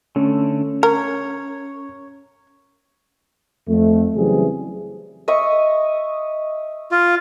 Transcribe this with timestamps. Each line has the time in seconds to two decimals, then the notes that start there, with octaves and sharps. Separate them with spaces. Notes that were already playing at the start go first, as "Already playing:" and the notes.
0.16 D3 A3 C#4
0.83 A#4 C#5
3.68 F2 A3
4.16 C#3 E3 F#3 G3 C4 G#4
5.28 D#5 E5 C#6
6.91 F4